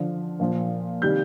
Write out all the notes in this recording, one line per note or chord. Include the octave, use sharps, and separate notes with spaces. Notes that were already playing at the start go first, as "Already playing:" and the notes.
Already playing: D3 F3
A#2 F3
C3 D#3 G3 G6